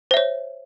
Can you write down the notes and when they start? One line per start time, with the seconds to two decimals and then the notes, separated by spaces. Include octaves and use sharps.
0.11 C5
0.14 E5
0.17 C#5